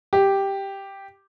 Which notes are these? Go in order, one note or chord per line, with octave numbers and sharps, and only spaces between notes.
G4